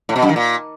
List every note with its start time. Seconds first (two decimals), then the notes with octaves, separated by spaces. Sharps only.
0.09 A2
0.16 B2
0.22 F#2
0.29 D#3
0.36 A#2